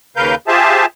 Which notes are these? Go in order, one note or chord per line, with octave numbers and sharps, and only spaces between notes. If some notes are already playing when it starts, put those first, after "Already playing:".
D#2 C#3 A#4 B4 F5 G6
F4 G4 G#4 C5 E5 A5